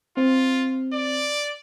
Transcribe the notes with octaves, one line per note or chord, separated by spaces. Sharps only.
C4 F4
D5